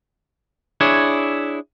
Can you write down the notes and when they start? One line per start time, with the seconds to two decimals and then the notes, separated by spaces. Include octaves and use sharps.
0.81 D4 E4 G#4 C#5